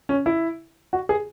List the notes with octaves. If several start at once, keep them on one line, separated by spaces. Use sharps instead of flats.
C#4
E4
F#4
G#4